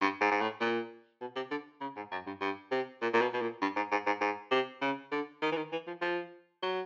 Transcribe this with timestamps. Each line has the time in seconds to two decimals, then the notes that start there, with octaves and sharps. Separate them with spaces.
0.01 G2
0.21 G#2
0.31 G#2
0.41 A2
0.61 A#2
1.21 B2
1.36 C3
1.51 D3
1.81 C#3
1.96 G#2
2.12 F#2
2.27 G2
2.41 G2
2.71 C3
3.01 A#2
3.14 A#2
3.21 B2
3.33 B2
3.41 A#2
3.62 G2
3.76 G#2
3.91 G#2
4.06 G#2
4.21 G#2
4.51 C3
4.81 C#3
5.12 D3
5.42 D#3
5.52 E3
5.57 D#3
5.72 E3
5.87 F3
6.01 F3
6.62 F#3